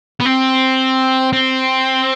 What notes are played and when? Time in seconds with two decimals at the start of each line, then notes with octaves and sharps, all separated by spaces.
0.21 B3
0.26 C4
1.33 C4